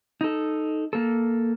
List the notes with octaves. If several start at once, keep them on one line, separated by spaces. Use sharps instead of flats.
D#4 A4
A#3 A4